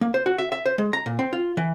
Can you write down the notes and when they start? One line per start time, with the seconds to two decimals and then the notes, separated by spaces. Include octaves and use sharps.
0.01 A#3
0.14 C5
0.26 F#4
0.38 E5
0.52 E5
0.66 C5
0.78 G#3
0.93 A#5
1.06 A#2
1.19 C4
1.33 F4
1.57 E3